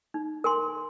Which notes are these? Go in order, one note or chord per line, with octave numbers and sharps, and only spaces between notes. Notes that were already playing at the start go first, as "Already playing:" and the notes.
D#4
A#4 G#5 C6